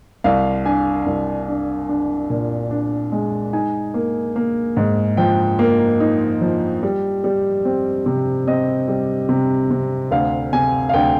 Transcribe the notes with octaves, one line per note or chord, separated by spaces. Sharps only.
C2 F5
D4 G#5
C2
D4
D4
A#2
D4
G#3
D#4 G#5
A#3
A#3
G#2
F3 G5
A#3
D#4
F3
G3
G3
C4
C3
C4 D#5
G3
C3
C3
D2 F5
C3 G#5
F5
D2 G5